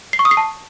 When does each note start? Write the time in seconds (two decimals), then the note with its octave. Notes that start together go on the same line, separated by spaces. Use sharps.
0.13 C7
0.19 C#6
0.25 D#6
0.31 C7
0.37 A5